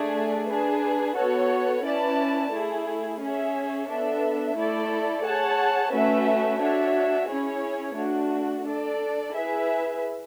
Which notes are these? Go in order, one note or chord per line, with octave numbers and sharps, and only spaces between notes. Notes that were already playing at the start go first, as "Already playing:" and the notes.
Already playing: A3 D4 G#4 D5
D4 G#4 B4
B3 F#4 A4 C#5
C#4 E4 B4 D5 A5
A3 E4 G#4
C#4 G#4 C#5 E5
B3 D4 A4 E5
A3 E4 A4 D5
G#4 C#5 F#5 A5
A3 C#4 F#4 B4 E5
D4 F#4 C#5 E5
C#4 E4 G#4 C#5
A3 D4 F#4
D4 A4 D5
E4 G#4 B4 E5